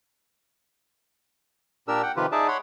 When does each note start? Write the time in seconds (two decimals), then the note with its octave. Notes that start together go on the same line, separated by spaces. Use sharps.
1.88 A#2 D4 G4 A#4 E6
2.03 F#5 G5
2.17 C3 D#3 F3 F4 G4 B4
2.32 D#4 G#4 D5 E5 A5
2.48 C#5 F#5 B5 C6